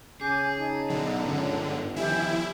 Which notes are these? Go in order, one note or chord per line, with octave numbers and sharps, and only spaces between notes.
C#3 G#4 G#5 D6 G6
D#4 A5
B2 D3 F#3
C#2 G2 C#4
G1
D#3 F3 E4 G4 G#5